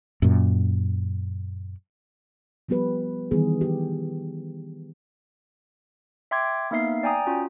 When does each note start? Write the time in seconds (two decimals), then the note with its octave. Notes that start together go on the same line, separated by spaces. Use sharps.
0.22 F#2 A#2
2.69 F3 G3 B3 G4 B4
3.31 D#3 E3 G3 B3 G#4
3.61 G4
6.31 E5 G5 C6 D6 G#6
6.71 A#3 B3 D#4 E5 F5 C7
7.03 D5 G5 G#5 A#5 D#6
7.27 C#4 F4 F#4